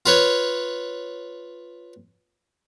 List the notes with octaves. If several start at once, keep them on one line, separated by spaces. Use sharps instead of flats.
F4 B4 C#5